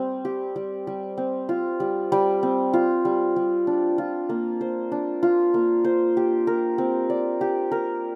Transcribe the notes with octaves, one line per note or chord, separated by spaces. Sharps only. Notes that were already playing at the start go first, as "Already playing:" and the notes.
Already playing: G3 C4
G4
G3
G3
C4
F4
G3
G3
C4
F4
G3
G3
D4
F4
A#3
C5
D4
F4
A#3
C5
G4
A#4
C4
D5
G4
A#4